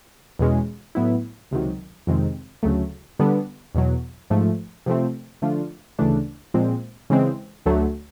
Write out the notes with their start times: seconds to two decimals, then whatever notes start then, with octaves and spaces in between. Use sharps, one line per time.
0.39 E2 B2 G#3 C#4
0.95 A2 F#3 B3 E4
1.51 C#2 C3 D#3 F#3
2.07 F2 C3 D#3 G#3 C4
2.63 D2 C#3 F#3 A3
3.19 D3 G3 B3 D4
3.75 E2 B2 F#3
4.30 G#2 F3 A3
4.86 C3 F3 A3 C4
5.42 D3 F3 A3 D4 F4
5.99 D2 C#3 E3 A3 D4
6.54 A#2 F3 G#3 C4
7.10 C#3 E3 G#3 C4
7.66 D2 D3 F#3 A3